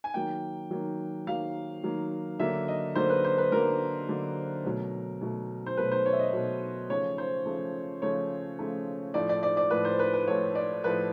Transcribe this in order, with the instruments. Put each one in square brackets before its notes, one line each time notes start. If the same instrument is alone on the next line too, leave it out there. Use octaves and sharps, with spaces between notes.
[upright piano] G#5
D#3 F#3 A#3 G5
D#3 F#3 A#3
D#3 F#3 A#3 F5
D#3 F#3 A#3
D3 F#3 A#3 E5
D#5
D3 F#3 A#3 C5
B4
C5
B4
D3 F#3 A#3 A#4
D3 F#3 A#3
B2 F#3 A3
B2 F#3 A3
C5
B2 F#3 A3 B4
C5
C#5
E5
D#5
B2 F#3 A3
C#3 F3 A3 C#5
C5
C#3 F3 A3
C#3 F3 A3 C#5
C#3 F3 A3
A2 F3 A3 D5
D5
D5
D5
A2 F3 A3 B4
C5
B4
B4
A2 F3 A3 C#5
D5
A2 F3 A3 B4